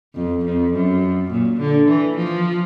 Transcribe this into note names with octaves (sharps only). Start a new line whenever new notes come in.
F2
F2
F#2
A#2
D3
E3
F3